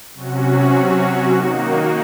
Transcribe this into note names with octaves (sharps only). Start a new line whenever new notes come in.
C3 F#3 C#4 F#4
D#3 A#3 D#4 F#4